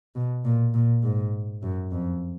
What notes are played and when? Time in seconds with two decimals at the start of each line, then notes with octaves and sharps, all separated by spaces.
0.15 B2
0.45 A#2
0.74 A#2
1.03 G#2
1.63 F#2
1.92 F2